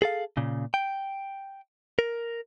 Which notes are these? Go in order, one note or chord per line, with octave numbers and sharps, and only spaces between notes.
G#4 A4 F5
A#2 C#3
G5
A#4